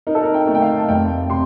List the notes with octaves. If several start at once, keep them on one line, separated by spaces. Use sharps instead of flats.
D#4 A#4
A4
A#4
G5
A3
G5
F5
A5
F1 G5
C3 C6